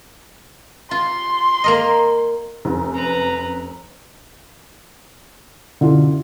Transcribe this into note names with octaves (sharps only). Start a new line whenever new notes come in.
F4 C6
A#3 A#4 D#5
F1 F#2
B4 A#5
F#2 B2 D3 E4 F4